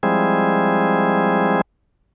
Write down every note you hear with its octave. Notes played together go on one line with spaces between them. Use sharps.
F3 G3 G#3 C4 E4 G#4